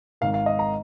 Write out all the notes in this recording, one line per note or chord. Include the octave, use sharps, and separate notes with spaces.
G#1 G#2 D#3 F5
F5
D#5
A#5